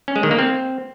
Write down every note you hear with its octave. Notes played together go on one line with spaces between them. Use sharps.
C#4
G#3
D#3
A#3
C4